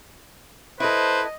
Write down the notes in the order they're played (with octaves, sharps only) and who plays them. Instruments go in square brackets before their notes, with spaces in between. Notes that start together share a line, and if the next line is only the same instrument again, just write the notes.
[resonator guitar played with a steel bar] E4 A4 [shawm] B4 [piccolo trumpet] C5 [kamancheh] D#5